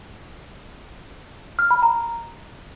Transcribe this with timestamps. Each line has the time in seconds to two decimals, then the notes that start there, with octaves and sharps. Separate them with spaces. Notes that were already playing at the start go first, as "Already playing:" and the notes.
1.59 F6
1.71 B5
1.83 A#5